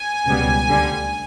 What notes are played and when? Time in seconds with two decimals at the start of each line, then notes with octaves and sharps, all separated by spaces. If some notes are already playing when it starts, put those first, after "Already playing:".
Already playing: G#5
0.26 C#2 B2 G3 B3
0.69 D2 D3 G3